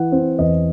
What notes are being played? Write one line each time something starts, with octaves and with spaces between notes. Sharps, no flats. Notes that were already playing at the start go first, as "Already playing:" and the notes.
Already playing: E3 F#5
C4
E2 D#5